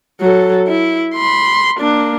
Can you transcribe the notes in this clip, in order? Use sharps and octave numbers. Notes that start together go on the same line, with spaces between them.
F#3 A4
E4
B5 C6
A#3 D4